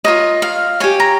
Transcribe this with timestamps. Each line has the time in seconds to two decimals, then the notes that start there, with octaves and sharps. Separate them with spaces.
0.04 F4 A#4 C#5 D#5
0.42 F5
0.80 G4 C#5 G#5
1.00 A#5